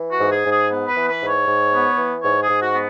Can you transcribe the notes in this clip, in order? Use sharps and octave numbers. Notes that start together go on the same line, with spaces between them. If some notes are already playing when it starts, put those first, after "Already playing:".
Already playing: E3
F#4
G#2
G#4
G#2
G#4
B3
B4
E3
B4
G#2
C#5
G#2
B3
E3
G#2 C#5
G#4
G#2
F#4
B3